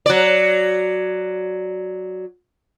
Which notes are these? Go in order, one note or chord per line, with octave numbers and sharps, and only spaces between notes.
F#3 D5